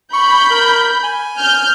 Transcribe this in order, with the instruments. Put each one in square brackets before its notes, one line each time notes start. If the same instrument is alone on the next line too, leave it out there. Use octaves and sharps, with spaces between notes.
[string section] B5 G6 [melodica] C#6
[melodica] A#4
G#5
[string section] F6 G6